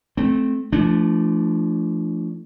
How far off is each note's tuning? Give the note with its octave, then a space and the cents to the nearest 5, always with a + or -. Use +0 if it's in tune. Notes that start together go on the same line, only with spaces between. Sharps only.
A3 -20 C4 -10
F3 -35 A3 +0 D4 +0